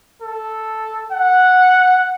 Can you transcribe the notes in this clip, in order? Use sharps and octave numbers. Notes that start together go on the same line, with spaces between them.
A4
F#5